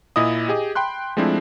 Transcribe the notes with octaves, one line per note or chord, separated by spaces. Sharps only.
A#2 E4 D#5 D#6
G4 G#4 D#5
G5 B5 C6 F#6
F3 G#3 A3 C4 D4 E4